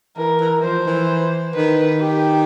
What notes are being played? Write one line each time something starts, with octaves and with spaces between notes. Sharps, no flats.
E3 A#4
E3
F3 C5
E3
D#3 B4
G4